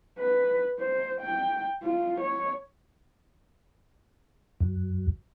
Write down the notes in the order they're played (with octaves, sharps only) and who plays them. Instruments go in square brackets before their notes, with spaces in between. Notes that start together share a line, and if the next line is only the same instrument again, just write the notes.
[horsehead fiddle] B4
C5
G5
F4
C#5
[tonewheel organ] F#2